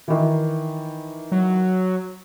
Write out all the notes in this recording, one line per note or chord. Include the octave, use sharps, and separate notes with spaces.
D#3 E3
F#3